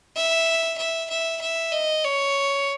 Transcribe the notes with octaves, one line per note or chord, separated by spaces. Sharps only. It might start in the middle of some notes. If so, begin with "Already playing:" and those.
E5
E5
E5
E5
D#5
C#5